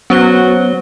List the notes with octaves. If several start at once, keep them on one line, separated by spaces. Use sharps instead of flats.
F#3 B3 C#4 F#4 C5 G7